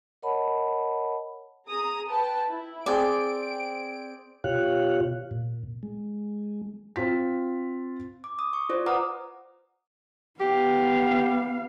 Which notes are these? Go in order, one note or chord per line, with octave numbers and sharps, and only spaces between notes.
A#4 C#5 D#5 F#5 A5 B5
G#4 A#5 D#6
B4 G5 A5
E4
C4 G#4 D5 G5 D7
B2 F4 G4 C#5 F5 F#6
A#2
G#3
C4 F4 B6
D6
D#6
C#6
F4 C5 D5
B4 F#5 A#5 D6 D#6 F6
B3 G4 F5